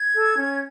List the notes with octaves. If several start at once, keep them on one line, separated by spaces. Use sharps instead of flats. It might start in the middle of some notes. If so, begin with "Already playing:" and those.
Already playing: G#6
A4
C#4